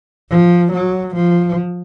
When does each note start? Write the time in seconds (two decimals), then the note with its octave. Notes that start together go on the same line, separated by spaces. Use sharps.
0.30 F3
0.73 F#3
1.16 F3